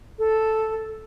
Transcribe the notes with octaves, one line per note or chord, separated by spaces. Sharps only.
A4